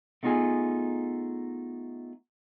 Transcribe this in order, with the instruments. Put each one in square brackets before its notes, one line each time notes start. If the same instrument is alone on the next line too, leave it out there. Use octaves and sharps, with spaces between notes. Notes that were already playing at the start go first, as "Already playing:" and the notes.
[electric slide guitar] A3 B3 D#4 F4 G#4 G#5